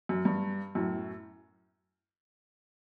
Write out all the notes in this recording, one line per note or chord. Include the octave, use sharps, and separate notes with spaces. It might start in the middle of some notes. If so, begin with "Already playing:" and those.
F#2
G2
F#2 A2